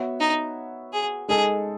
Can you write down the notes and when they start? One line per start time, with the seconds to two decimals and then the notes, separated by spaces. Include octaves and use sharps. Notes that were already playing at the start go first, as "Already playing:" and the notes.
Already playing: B3 F#4 C#5 E5
0.20 D#4
0.93 G#4
1.28 G#3 D#4 G#4 A4